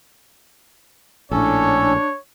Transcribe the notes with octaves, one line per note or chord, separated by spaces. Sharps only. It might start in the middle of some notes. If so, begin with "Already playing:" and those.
A#1 A2 C#4 D4 A4 C#5